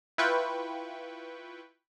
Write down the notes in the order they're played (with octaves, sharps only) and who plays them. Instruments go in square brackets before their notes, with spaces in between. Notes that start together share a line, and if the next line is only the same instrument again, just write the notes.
[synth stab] E4 F4 B4 G5 C#6